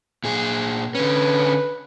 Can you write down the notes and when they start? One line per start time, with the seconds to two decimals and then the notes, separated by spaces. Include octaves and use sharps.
0.24 A#2 G#4
0.95 D3 C#4 B4